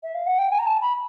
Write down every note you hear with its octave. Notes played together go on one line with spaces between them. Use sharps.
E5
F5
F#5
G5
G#5
A#5
A5
B5